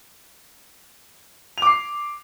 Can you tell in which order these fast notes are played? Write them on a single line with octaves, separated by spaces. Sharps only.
F7 D6 C7